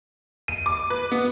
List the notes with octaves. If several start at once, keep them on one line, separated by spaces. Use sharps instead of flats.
D#7
D6
B4
B3